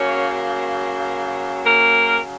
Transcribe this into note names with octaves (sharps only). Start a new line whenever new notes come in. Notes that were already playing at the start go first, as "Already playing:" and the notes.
Already playing: C#3 F#3 A#3 C#4 C#5
A#3 A#4